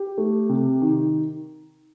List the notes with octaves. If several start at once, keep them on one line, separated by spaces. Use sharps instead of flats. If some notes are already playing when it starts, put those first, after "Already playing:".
Already playing: G4
A3
C3
D#3